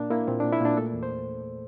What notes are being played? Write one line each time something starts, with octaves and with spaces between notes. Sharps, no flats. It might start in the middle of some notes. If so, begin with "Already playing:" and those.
Already playing: A#2 A#3 D4
A#3 E4
A#2 C4
D4
A#2
E4
A#2 D4
A3 A4
E2
C5